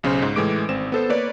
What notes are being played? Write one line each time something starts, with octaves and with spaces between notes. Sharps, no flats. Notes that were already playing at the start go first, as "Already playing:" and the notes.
B1 C#3 C#4 C5 C6
G#2
A2 E3 G#3 D6 D7
G#1 C4 E7
B3 A4 C5
A#3 B4 C#5 D5